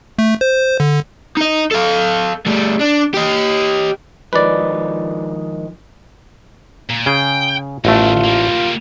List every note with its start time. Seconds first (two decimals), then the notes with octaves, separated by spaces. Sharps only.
0.19 A3
0.41 C5
0.80 D3
1.37 D#4 D#5
1.71 A4 F5
2.47 G3 A3
2.81 D4
3.14 G4 D#5
4.33 D#3 F3 G#3 B4 D5
6.90 A#2
7.06 C#3 G#4 G5
7.85 A1 B2 D#3 A3 F4
8.25 G3 A#3